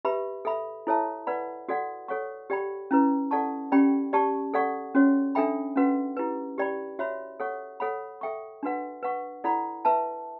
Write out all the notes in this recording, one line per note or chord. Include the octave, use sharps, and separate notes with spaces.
G4 B4 E5 B5
A4 E5 B5
E4 A4 C#5 E5 A5
B4 D5 F#5 B5
F#4 A4 D5 F#5
A4 C#5 F#5 C#6
G4 D5 G5 B5
C#4 E4 B4
A4 D5 F#5 A5 C#6
C#4 G4 D5 G5 B5
G4 D5 A5 C#6
A4 D5 F#5 C#6
C#4 F#4 C#5
D4 A4 E5 G5 B5
C#4 F#4 B4 F#5
E4 G4 B4
G4 D5 G5 B5
F#4 C#5 E5 B5
A4 C#5 F#5 C#6
A4 C#5 F#5 B5
A4 E5 G5 C#6
D4 F#4 B4 F#5
B4 F#5 C#6
E4 A4 D5 F#5 B5
B4 E5 A5